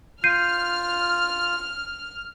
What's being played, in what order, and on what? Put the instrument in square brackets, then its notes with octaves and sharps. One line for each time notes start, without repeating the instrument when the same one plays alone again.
[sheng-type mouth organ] F4 [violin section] F6 [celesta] G6 C7 D#7